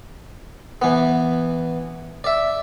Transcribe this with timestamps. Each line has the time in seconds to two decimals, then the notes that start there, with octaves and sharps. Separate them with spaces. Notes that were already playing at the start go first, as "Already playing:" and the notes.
0.82 E3 B3
2.24 D5 E5